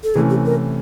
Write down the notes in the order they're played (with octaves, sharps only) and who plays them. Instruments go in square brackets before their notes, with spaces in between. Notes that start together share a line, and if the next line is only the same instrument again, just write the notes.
[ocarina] A4
[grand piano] C3 E3 A3 C#4 [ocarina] G#4
[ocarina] G4
A#4